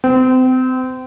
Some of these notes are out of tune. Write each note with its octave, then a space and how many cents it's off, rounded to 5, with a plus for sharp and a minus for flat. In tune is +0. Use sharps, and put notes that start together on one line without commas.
C4 -30